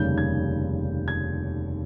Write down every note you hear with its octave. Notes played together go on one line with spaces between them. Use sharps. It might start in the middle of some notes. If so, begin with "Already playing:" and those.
Already playing: F1 D#2 C#3 G3 G6
G#6
G#6